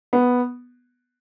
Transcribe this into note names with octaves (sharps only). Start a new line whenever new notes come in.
B3